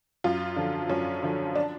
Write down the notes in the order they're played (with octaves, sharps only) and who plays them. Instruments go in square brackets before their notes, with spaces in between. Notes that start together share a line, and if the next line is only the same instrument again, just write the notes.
[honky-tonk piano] F#2 F4
D3 F3
F#2 C#4
D3 F3
D4